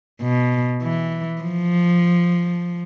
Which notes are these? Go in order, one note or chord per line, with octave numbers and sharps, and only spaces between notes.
B2
E3
F3